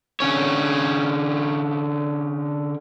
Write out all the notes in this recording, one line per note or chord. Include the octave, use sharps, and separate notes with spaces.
D3 C#4 C#5